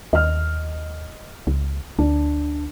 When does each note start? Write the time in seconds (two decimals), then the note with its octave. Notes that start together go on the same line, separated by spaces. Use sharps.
0.13 D#2 D#5 F6
1.47 C#2
1.99 D2 D4